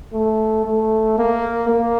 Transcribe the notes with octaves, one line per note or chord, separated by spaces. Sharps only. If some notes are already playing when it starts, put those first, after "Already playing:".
A3
A3
A#3
A#3